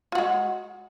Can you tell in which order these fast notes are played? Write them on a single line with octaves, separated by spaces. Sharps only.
F4 F#4 G#3